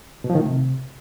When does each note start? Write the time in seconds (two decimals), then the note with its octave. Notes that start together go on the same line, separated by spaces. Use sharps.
0.24 B2
0.30 F3
0.35 D#3
0.41 A3
0.46 C3